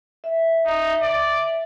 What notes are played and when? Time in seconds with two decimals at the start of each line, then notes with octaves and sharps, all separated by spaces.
0.24 E5
0.66 D#4
1.01 D5